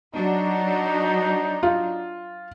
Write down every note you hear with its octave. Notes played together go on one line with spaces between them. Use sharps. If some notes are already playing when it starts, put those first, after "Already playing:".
F#3 D4 D#4
F4